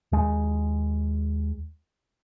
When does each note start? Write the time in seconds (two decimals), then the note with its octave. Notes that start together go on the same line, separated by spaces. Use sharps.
0.12 D#2 G#3